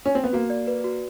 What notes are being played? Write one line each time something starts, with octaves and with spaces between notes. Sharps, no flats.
C#4
C4
B3
A#3 F#4
D5
B4
F#4